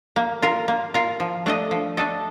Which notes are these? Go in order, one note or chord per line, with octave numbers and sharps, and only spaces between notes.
A#3
F4 A#4
A#3
F4 A#4
F3
A3 D4 A4 D#5
F3
A3 D4 A4 D#5